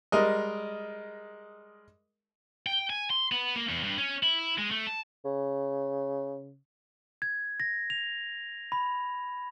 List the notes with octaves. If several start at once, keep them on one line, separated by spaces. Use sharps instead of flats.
G3 G#3 A#4 D#5
G5
G#5
C6
B3
A#3
E2
G2
C#4
E4
G#3
A3
A5
C#3
G#6
A#6
F7
B5